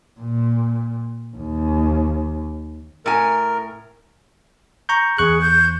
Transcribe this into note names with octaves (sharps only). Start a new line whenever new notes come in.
A#2
D#2
A2 A#4 G#5
A#5 C#6 G6
E2 G#4 C#6 F#6
G6